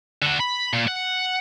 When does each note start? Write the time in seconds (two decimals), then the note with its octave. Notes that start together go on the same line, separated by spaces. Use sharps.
0.22 D3 F#4
0.40 B5
0.73 A#2
0.88 F#5